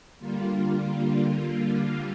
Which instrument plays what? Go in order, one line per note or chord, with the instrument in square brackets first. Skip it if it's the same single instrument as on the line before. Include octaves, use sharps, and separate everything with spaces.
[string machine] D3 G3 A#3 F4